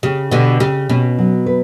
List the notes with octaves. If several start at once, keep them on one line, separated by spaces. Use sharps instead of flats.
C#3 G4
B2 D3 G4
C#3 G4
B2 C#4
F#3
B4